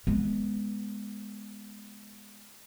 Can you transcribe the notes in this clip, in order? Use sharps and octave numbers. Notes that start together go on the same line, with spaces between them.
G#3 B3